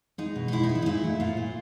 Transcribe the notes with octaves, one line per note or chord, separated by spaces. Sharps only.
G#3 D#4
B2
D#4
G#3 E4
D#4
G#3
E4
D#4
A#2 E4
A3
A#2 F4
A#2